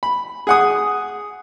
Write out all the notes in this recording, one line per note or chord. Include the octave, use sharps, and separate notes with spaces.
B5
G#4 F#5 D#6